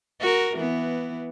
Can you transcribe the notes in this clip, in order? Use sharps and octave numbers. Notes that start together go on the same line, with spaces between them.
F#4 A#4
E3 B3